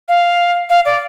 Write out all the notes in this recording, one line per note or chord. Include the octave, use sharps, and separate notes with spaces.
F5
F5
D5